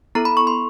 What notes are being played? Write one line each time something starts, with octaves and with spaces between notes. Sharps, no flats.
B3 E4 A4 A#5
B5
C#6
C6